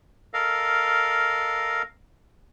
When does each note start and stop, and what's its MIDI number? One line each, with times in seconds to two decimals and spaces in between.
0.34 1.82 69
0.34 1.82 70
0.34 1.82 75
0.34 1.82 77